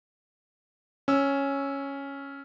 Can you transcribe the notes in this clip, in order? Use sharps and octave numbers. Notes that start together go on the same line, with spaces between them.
C#4 E6